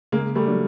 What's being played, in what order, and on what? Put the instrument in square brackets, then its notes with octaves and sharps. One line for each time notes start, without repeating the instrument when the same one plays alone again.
[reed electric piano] C#3 [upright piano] G#3 A#3
[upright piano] G3 A3
[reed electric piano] F#3 A#3 D4